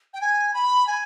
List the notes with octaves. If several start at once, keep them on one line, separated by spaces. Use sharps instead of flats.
G5
G#5
B5
G#5